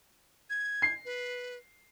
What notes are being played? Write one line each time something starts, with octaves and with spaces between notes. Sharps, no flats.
G#6
C7
B4